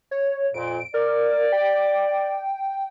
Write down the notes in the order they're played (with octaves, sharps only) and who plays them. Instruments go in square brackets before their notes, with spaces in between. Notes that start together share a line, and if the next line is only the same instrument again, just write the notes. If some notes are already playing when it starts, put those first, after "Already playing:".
[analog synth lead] C#5
[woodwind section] F2 A#2 [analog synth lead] D7
[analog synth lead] A#4 [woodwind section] D5
[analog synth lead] G5